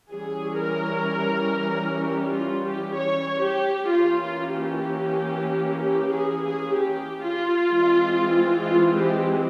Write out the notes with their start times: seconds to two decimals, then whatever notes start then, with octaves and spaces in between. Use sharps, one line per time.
0.11 E3 G3 C#4 G#4
0.59 A#4
2.01 G4
2.33 F4
2.64 G4
2.97 C#5
3.43 G4
3.90 E3 A#3 C#4 F4
4.23 F4
4.54 G4
5.80 G4
6.12 G#4
6.43 G#4
6.74 G4
7.22 F4
7.70 E3 G#3 C4
8.64 F4
8.95 G4